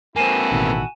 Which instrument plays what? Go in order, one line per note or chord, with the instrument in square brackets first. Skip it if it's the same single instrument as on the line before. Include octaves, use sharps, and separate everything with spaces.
[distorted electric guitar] A#3 C4 [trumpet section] E4 F#4 A4 [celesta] G#5 D#7 E7
[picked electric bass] A1 B2 D#3